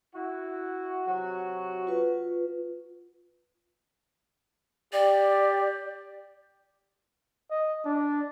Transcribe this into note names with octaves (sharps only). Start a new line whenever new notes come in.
E4 F#4
C3 F#3 F#4
F4 B4
G4 D5
D#5
D4